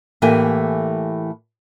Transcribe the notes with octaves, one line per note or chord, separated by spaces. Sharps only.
A2 E3 A3 A#3 G4 G#5